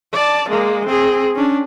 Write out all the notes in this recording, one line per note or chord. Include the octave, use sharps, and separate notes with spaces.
D5 A5
G#3 A#3
C4 G#4
C#4 D4